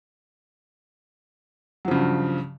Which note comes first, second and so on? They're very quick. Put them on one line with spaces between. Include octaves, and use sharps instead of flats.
F#3 F3 C#3 G2